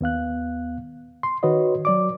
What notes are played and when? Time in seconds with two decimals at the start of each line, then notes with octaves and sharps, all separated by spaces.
0.01 D#2 B3 F5 F#6
1.23 C6
1.43 D#3 F#4 B4 C#5 D#5
1.85 F#3 D5 D6